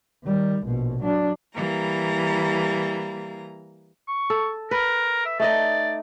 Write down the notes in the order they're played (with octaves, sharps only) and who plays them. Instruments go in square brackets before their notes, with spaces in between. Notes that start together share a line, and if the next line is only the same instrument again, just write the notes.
[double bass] D#3 G3
A#1 B2
F#3 D4
[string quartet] E3 G3 A#3 A#5
[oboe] C#6
[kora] A4
[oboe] A#4 [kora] B4
[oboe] E5
[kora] A3 D#4 D#5 [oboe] D5